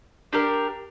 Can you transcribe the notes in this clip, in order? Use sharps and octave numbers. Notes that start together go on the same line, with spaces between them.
D4 G4 A#4